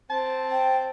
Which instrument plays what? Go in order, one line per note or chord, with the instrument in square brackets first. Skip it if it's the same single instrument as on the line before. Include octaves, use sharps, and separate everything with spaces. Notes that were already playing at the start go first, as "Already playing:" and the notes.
[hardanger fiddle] C4 [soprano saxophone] A5
[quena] G5